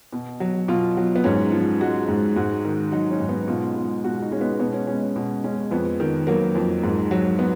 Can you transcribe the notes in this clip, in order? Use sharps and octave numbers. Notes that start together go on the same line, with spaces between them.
B2
F#3
B2 F4
F#3
B3
G#2 C#4
F3
G#3 F#4
G#2
G#2 F#4
D#3
F#3 D#4
C#4
G#2
B3
B2 F4
G#3
B2 F#4
D#4
G#3 C#4
B3
B2 B3
C#4
G#3 C#4
C#4
B2
G#3 C#4
F2 B3
D#3
F#3 A#3
F2
G#2
F#3
B3